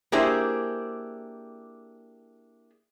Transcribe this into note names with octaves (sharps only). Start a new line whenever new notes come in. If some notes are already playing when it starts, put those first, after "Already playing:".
A#3 D4 E4 G4 G#4 C5